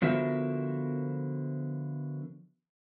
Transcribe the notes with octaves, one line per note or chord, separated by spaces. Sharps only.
D3 F3 B3 F#4 A#4 E5